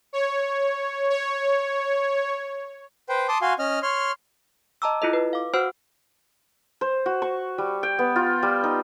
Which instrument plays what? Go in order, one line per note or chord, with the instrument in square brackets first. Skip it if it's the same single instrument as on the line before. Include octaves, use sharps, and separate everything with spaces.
[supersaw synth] C#5
C#5
[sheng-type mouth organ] B4 C5 G5
A5 C6 D6 D#6
F#4 F5 G#5 C6
C#4 D#5 F6
C#5 C6 F6
[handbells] D#5 A5 A#5 D6 E6
E4 F4 A4 D#5
B4
F5 D6
F#4 C5 F#5 E6 F6
[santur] C5
F#4
C#6
G3
G5
B3
F4
G3
D#4